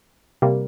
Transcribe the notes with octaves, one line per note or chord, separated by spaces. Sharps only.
C3 G3 A#3